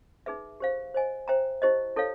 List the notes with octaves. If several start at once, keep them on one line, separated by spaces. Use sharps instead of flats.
D#4 G#4 B4 E5
G4 C5 F5
C5 D#5 G#5
C5 E5 G5 A#5
E4 G4 C5 D#5
E4 A4 C#5 F5